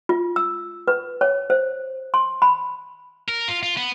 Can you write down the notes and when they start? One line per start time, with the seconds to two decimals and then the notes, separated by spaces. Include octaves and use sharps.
0.09 F4
0.36 E6
0.88 B4
1.21 C#5
1.50 C5
2.14 C6
2.42 B5
3.28 A#4
3.48 F4
3.63 F4
3.77 B3